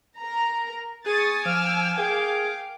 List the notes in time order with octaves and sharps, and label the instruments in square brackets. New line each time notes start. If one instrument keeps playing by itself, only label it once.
[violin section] A#4 A#5
[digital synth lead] G#4 [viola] G#5 [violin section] C#6 D#6 A6
[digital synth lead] F3 [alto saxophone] F5 [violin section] D6 E6 F6
[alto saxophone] G#4 [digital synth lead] A#4 [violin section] F5 G5 D6